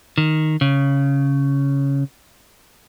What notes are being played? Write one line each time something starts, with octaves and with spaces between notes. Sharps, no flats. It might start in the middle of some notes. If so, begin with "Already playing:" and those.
D#3
C#3